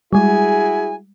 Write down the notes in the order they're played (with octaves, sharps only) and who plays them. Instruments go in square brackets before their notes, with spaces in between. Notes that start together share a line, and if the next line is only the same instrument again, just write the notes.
[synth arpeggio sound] G3 G#3 [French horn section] E4 F#4 G#4 [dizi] G#5